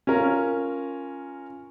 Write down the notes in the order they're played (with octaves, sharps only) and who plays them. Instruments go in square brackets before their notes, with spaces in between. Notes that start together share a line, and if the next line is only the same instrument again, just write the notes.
[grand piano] C#4 F4 A#4